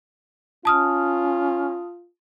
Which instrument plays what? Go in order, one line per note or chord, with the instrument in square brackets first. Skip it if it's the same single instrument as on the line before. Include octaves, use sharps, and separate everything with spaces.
[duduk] C#4 [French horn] F4 [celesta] A5 D#6 F6